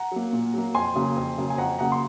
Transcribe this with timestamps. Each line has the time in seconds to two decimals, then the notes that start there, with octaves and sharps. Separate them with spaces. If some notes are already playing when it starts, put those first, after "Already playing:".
Already playing: F#5 A#5
0.12 F#3 A#3
0.33 A#2
0.54 F#3 A#3
0.75 F2 G#5 C6
0.95 C#3 F#3 A#3
1.16 F2
1.38 C#3 F#3 A#3
1.50 G#5
1.58 F2 F#5 A#5
1.79 C#3 F#3 A#3 F#5 A#5
1.92 C6